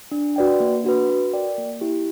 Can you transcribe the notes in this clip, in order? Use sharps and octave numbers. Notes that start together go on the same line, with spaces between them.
D4
F#4 B4 D5 G5
A#3
D4 F#4 B4
F#4
A#4 D5 G5
A#3
E4 G4